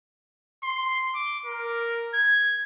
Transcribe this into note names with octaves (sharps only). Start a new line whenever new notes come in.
C6
D6
A#4
G#6